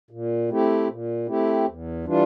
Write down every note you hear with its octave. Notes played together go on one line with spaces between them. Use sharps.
A#2
A3 C4 E4 G4
A#2
A3 C4 E4 G4
E2
E3 G3 D4 F4